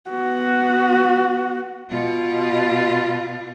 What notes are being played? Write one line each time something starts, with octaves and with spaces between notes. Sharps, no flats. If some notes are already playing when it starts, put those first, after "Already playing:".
B3 F#4
B2 F4